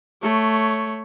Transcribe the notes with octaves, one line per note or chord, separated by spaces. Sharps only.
A3 C#5